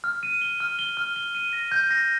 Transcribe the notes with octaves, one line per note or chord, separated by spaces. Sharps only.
F6
D#7
G7
F6
G7
F6
G7
D#7
A#6
G6
A#6